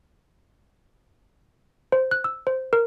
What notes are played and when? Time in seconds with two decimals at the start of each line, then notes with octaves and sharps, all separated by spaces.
1.92 C5
2.11 F#6
2.24 E6
2.47 C5
2.73 A#4